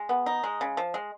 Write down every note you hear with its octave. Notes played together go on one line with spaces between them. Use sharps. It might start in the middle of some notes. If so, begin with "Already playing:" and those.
Already playing: G#3
B3
D#4
G#3
C#3
F3
G#3